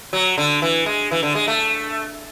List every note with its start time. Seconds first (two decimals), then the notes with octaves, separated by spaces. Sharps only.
0.13 F#3
0.38 D3
0.62 E3
0.86 G#3
1.11 E3
1.23 D3
1.35 G#3
1.48 A3